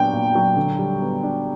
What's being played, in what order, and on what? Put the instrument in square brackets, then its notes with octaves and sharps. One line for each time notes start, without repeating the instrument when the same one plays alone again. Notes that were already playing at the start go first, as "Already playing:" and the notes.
Already playing: [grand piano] A#2 F#3 B3 D4 [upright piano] G5
[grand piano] A#2
F#3
D3
G3
B3
D4